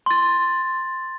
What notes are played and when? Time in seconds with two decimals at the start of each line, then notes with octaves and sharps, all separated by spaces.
0.06 C6 A6